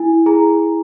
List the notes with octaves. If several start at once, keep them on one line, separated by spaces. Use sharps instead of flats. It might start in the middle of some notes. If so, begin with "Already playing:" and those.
Already playing: E4 G#5
G#4 A#5